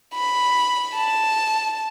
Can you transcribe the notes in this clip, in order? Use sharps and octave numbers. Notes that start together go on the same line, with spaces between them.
B5
A5